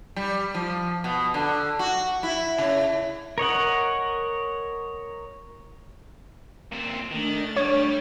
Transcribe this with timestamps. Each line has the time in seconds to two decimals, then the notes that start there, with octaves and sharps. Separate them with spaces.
0.16 G3
0.54 F3
1.04 B2
1.34 D3
1.79 F#4
2.23 E4
2.58 C#3
3.38 A#4 C#5 D#5 F#5
6.72 A#2 C4
7.11 D#3 A3 D4 A6
7.56 G3 C#5